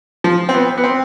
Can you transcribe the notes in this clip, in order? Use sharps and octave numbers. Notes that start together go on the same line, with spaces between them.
F3
C4
B3
B3
C4